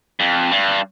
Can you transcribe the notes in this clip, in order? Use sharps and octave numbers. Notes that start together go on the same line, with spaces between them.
F2
G2